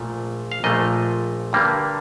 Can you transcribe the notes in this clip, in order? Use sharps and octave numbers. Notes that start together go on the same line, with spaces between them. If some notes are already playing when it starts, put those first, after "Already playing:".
Already playing: A#1 A#2 F3 A3
F5
A#1 A#2 F3 A3 D#5
G2 D3 G3 A#3